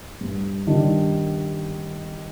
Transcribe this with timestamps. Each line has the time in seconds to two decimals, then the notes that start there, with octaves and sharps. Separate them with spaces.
0.21 G2
0.67 D#3 G3 D4